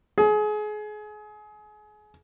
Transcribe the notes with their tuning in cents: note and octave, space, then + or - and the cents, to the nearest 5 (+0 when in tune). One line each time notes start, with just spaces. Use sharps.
G#4 +30